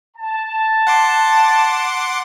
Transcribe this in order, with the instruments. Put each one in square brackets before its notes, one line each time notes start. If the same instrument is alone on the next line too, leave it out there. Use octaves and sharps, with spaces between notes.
[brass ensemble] A5
[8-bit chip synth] F#5 C6 D6